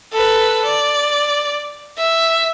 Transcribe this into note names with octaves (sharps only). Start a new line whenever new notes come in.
A4 B4
D5
E5